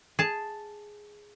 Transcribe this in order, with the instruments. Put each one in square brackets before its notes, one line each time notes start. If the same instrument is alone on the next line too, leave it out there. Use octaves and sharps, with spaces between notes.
[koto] G#4 A5